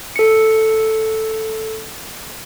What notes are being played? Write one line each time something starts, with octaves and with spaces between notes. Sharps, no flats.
A4 C#7